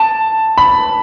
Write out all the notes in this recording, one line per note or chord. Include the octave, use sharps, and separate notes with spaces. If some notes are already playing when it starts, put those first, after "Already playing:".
Already playing: A5
B5